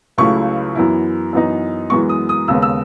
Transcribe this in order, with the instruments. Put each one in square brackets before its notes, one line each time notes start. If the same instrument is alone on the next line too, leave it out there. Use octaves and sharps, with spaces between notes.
[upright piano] C#2 C#3 F#3 A3 E4 C#6
F#2 E3 B3 E4
F#2 E3 B3 D#4
F#2 E3 G#3 B3 C#6
D#6
D#6
D#2 C#3 G#3 B3 E6
E6